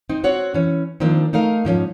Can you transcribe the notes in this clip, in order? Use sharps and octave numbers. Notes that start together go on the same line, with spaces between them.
C4 D#4
C4 F#4 C#5 F#5
E3 C#4
D#3 F3 A#3 C4 D4
A3 D#4 A#4 F5
G#2 F3 C#4